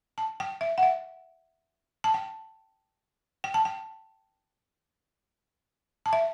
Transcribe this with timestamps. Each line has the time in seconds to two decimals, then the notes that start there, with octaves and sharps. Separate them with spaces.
0.18 A5
0.40 G5
0.61 E5
0.78 F#5
0.83 E5
2.04 A5
2.14 G5
3.44 G5
3.54 A5
3.65 G5
6.06 A5
6.13 E5